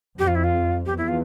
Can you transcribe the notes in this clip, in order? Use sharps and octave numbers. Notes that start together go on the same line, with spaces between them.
F2 G4
F4
E4
F4
E2 G4
E4
F4